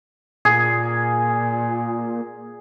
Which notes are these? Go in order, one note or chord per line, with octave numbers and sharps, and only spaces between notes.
A#2 G#4